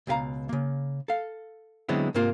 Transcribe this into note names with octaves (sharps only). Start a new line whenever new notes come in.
C#2 B2 G4 F5 A#5
C#3 A#3
A4 F5
D3 F#3 G#3 B3 C4 E4
G#2 C3 A#3 F4